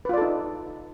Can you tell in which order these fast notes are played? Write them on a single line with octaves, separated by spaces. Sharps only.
B4 F4 D5 A4 D#4